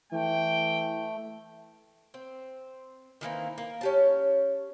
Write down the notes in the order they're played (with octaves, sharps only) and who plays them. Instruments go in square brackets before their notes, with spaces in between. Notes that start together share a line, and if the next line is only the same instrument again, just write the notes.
[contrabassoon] E3 [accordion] A3 [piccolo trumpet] G5
[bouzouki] C4
D#3 E3 A#3 C4
A#3
C#4 G4 A5